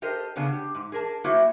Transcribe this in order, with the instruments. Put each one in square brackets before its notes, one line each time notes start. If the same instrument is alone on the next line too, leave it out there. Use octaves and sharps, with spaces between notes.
[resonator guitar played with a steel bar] G4 A4 A#4 C5 D#5
C#3 B3 C#4 D4
G4
G#2
G#4 A#4 A5
F#3 A#3 E4 F#4 C5 E5